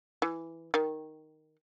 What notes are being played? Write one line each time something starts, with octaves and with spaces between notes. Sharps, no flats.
E3
D#3